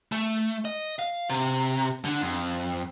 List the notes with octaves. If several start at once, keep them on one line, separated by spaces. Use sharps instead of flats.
A3
D#5
F5
C3
D3 D4
F2